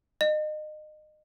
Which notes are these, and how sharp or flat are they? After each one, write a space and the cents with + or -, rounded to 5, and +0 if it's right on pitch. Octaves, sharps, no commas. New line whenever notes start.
D#5 -30